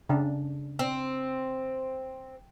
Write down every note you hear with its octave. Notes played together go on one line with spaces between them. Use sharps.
C#3 D4
C4